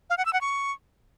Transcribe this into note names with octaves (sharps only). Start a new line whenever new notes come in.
F5
F#5
E6
F#5
C#6